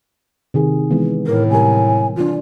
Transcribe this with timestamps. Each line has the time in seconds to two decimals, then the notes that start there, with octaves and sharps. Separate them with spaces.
0.54 C3 D#3 G#4
0.90 E3 G#3 B3
1.27 A2 A#4
1.50 C3 G3 A#4 G#5
2.16 E3 D4 F4